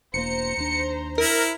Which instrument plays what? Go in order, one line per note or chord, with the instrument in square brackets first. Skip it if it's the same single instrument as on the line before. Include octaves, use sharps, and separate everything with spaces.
[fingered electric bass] E1 A#3 [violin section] C5 A#5 [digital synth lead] C#7
[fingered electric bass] D#2 D4
[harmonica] E4 [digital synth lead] A#4